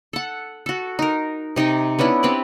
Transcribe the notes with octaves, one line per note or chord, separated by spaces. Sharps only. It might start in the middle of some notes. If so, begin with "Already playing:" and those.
A4 F#5
F#4 A4
D#4 A#4
C3 D#4 D#5 G5
B3 C#4 D4 E4
C4 G4 B4 D5